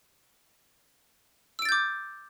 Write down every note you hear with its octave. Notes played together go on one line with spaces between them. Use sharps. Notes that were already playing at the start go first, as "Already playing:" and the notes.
D6 E6 G6 A6 D7